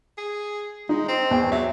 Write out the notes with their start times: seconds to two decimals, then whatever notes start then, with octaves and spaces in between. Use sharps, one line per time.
0.18 G#4
0.89 G#3 D#4
1.08 C4
1.31 E2 G5
1.52 F#3 E5